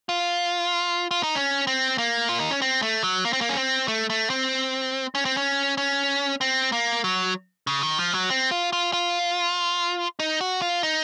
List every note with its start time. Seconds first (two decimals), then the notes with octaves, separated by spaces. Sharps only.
0.09 F4
1.11 F4
1.23 D#4
1.35 C#4
1.67 C4
1.98 A#3
2.29 F4
2.40 D#4
2.51 C#4
2.62 C4
2.82 A3
3.04 F#3
3.25 A#3
3.33 C4
3.41 A#3
3.49 C#4
3.57 C4
3.88 A3
4.10 A3
4.30 C4
5.15 C#4
5.25 C4
5.37 C#4
5.78 C#4
6.41 C4
6.72 A#3
7.04 F#3
7.67 C#3
7.83 D#3
7.99 F3
8.14 F#3
8.30 C4
8.51 F4
8.73 F4
8.93 F4
10.19 D#4
10.41 F#4
10.62 F4
10.83 D#4